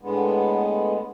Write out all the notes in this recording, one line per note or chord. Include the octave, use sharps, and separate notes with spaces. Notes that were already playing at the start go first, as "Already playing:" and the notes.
A2 D3 G#3 B3